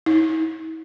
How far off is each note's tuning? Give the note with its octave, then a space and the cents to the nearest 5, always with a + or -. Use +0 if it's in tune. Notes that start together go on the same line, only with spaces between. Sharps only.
E4 -45